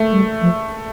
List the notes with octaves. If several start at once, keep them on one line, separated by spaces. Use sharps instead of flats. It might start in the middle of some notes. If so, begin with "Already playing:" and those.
Already playing: A3
G3
F3